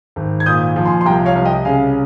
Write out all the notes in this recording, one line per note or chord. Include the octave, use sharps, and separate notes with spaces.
G#1
G#6
A#2 D#6 G6
F3
G#5 C6
C6
C2 G5 A#5
C#5 F5
C2
D#5 G5
C#3 F5 G#5